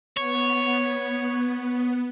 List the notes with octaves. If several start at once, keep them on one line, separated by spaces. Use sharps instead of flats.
B3 C#5